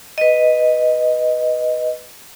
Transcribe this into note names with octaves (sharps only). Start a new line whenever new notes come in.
B4 D#5